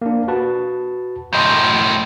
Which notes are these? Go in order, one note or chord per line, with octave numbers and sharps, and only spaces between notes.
A#3 D4
F#4 B4 A5
F#2 A2 D#5 C6 G6